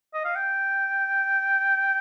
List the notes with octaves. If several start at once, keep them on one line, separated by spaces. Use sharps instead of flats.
D#5
F5
G5